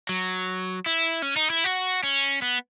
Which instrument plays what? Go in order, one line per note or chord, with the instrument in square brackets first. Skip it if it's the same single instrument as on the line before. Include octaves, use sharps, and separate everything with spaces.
[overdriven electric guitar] F#3
E4
C#4
D#4
E4
F#4
C#4
B3